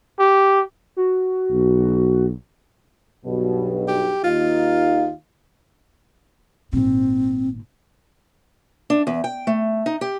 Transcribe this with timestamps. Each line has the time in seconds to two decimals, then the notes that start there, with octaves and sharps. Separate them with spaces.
0.19 G4
0.97 F#4
1.51 B1
3.25 B1 G2 B2
3.88 G4
4.24 D#2 D#4 F4 F5
6.73 G#1 A#2 C4
8.90 D4
9.07 E2
9.24 G5
9.47 A3
9.86 D#4
10.01 G4